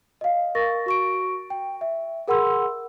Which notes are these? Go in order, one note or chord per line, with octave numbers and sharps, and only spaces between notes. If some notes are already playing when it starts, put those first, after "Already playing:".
D#5 F5
A#4 C#6 A6 A#6
F#4 C#6 D7
G5
E5
G#4 A#4 F#5 B5 C6 E6